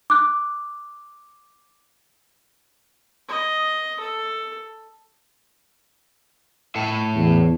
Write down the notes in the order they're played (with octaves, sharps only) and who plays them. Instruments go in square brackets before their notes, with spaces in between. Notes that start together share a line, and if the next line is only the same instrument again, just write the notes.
[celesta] D6 F#6
[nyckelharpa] D#5
A4
[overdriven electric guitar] A2 A4
[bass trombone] E2